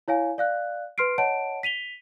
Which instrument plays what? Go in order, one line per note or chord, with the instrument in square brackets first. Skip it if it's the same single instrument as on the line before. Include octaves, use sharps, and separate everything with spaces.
[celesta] E4 C#5 F5 G#5
D5 F5 F#6
B4 C6 F6 C7 D7
C#5 D#5 F#5 A5 D7
B6 D#7 F7 G7